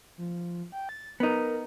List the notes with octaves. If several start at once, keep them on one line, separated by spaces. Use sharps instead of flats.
F3
G5
A6
B3 D#4 A#4